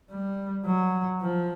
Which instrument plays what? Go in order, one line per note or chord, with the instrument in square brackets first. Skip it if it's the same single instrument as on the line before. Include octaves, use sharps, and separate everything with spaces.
[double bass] G3
F#3
F3